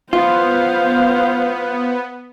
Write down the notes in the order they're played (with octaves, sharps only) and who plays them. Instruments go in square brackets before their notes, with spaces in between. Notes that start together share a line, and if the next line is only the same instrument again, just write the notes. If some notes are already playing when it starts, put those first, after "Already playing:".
[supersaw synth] B3 [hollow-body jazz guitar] F4 [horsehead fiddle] C5 F5